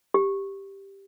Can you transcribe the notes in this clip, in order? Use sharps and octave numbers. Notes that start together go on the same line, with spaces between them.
G4